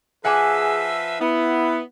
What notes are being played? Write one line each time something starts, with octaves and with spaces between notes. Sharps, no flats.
F3 G#4 B4 E5 F#5 G#5 D6
B3 E4